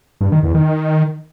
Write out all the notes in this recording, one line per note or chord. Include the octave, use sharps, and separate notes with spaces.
G2
D#3
E2
D#3